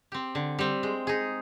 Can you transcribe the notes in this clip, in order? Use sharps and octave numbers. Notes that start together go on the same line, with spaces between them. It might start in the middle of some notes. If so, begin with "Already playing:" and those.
C4 G4
D3
G3 C4
G#3
D#4 G#4